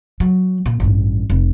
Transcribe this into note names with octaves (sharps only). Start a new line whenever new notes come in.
F#3
A#2
A1 G2
F1